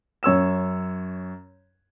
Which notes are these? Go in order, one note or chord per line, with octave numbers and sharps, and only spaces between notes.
F#2 C#5 E6 E7